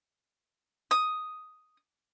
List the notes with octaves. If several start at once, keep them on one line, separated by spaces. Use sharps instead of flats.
D#6